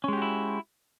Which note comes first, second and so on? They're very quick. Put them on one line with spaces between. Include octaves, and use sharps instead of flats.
C#4 G#3 G4 F#4 E4